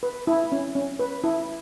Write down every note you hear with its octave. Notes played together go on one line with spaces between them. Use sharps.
B4
E4
C#4
C#4
B4
E4